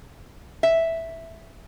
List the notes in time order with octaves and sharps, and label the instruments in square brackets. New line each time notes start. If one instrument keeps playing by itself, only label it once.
[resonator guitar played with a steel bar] E5